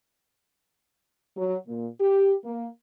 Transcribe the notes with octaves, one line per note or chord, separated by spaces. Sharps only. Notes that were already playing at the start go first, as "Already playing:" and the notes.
F#3
A#2
G4
A#3